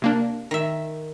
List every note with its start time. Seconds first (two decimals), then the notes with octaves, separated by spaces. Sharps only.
0.02 C3 A#3 D4
0.51 D#3 E5